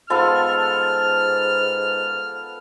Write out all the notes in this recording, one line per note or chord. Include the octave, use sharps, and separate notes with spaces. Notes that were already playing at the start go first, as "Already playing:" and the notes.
G#2 B3 F4 A4 F6